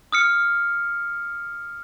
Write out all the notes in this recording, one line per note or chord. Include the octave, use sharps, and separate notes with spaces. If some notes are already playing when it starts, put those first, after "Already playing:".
D#6 F6 C#7